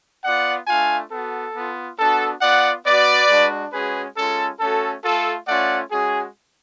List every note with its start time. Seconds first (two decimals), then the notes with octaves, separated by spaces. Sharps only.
0.24 B3 F4 D5 F#5
0.68 A3 D4 F4 F5 G#5
1.11 B3 F#4 A4
1.55 B3 F4
1.98 B3 D4 F#4 A4
2.42 B3 F4 D5 F#5
2.85 B3 F#4 B4 D5
3.30 G#3 D4 F#4
3.73 G#3 C#4 F#4 G#4 B4
4.17 G#3 C#4 F4 A4
4.60 A3 C#4 F#4 A4
5.04 A3 F4 A4
5.48 A3 C#4 F4 D5 F#5
5.91 G#3 C#4 F#4 G#4